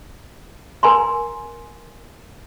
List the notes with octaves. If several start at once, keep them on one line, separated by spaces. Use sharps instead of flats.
A#4 G#5 A#5 C6